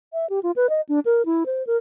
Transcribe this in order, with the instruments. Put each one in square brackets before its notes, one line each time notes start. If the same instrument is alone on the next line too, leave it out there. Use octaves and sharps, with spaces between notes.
[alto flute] E5
G4
F4
B4
D#5
D4
A#4
E4
C5
A#4